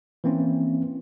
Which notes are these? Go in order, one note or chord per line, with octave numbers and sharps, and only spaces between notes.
E3 A#3 C4 C#4